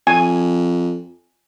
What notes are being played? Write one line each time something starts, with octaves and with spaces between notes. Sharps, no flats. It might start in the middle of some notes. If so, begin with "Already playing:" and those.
F2 G#5